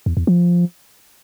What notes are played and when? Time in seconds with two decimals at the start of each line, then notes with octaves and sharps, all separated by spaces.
0.06 E2
0.17 E2
0.27 F3